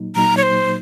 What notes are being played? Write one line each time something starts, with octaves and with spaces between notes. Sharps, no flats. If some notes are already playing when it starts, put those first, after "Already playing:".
Already playing: A#2 F#3 A#3 D#4
A#2 F#3 A#3 D#4 A#5
C#5
C5